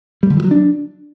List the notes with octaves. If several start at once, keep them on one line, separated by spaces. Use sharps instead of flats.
G3
D3
E3
F#3
D4